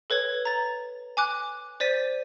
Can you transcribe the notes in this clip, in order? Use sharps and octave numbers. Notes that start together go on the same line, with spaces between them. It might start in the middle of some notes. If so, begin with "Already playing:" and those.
A4 B4 C#5 G#6
A#5 A6
G#5 D6 F#6
C5 D5 A6 B6 D#7